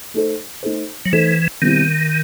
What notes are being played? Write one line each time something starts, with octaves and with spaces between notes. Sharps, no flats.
A3 D#4 A4 C5
A3 D#4 A4 C5
F#3
E3 A3 D#4 A4 C5
B2 D#3 G3 C4 E4